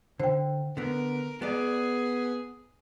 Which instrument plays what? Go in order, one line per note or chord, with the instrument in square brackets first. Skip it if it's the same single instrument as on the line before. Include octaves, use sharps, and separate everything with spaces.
[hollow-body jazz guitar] D3 [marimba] C5 G5
[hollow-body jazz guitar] D3 B3 [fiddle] A#4
[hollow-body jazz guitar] B3 D5 [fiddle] G#4